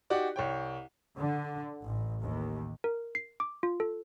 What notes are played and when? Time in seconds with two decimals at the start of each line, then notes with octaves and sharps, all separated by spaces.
0.10 D#4 F#4 G4 D5
0.36 C2 C#5 G5
1.18 D3
1.84 A1
2.22 D#2
2.84 A#4
3.15 C7
3.40 D6
3.63 F4
3.80 A4